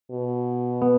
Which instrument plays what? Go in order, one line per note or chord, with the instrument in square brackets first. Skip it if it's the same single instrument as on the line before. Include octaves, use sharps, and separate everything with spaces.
[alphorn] B2
[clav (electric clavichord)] B3